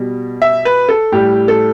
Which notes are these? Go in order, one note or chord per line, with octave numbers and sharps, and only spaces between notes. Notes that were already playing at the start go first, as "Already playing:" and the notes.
Already playing: B2 G3
E5
B4
A4
A2 G3 G4
A4